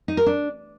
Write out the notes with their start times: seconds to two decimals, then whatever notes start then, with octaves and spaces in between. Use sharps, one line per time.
0.08 D#4
0.17 A#4
0.26 D4